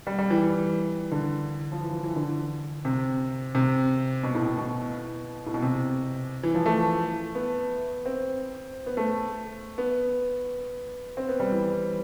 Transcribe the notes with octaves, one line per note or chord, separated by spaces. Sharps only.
G3
G3
E3
D3
F3
E3
F3
E3
D3
C3
C3
B2
A2
B2
B2
A2
B2
C3
E3
F3
A3
B3
C4
B3
A3
B3
C4
B3
G3
E3